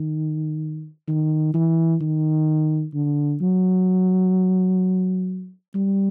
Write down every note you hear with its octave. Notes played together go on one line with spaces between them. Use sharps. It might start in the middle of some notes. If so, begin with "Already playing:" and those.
Already playing: D#3
D#3
E3
D#3
D3
F#3
G3